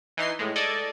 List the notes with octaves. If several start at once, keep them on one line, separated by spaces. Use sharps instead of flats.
E3 D#4 C6 C7
A2 G#3
A4 D5 D#5 G#6